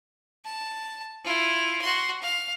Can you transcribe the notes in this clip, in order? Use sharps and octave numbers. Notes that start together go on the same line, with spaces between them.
A5
E4 F4
F#4 C6
F5